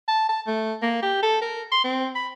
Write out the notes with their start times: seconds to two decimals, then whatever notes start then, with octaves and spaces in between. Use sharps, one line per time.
0.08 A5
0.29 A5
0.47 A3
0.82 A#3
1.02 G4
1.22 A4
1.42 A#4
1.72 C6
1.84 C4
2.15 B5